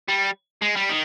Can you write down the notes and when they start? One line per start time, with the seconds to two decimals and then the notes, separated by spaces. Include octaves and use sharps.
0.09 G3
0.62 G#3
0.76 G3
0.89 D#3